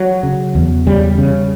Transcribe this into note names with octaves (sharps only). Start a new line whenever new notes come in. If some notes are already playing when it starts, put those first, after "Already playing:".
Already playing: F#3
C#3
E2
C#3 G3
C#3